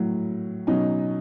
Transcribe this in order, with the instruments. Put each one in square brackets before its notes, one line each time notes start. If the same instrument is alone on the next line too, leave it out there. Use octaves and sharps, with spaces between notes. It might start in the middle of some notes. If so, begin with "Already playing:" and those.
Already playing: [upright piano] A2 F#3
B2 F#3 C#4 D#4